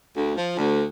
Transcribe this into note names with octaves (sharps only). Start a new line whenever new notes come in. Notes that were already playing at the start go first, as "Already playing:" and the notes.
D2
F3
D2